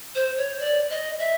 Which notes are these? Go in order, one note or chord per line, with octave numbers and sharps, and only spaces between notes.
C5
C#5
D5
D#5
E5